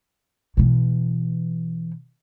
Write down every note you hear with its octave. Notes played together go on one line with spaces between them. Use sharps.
B2 E3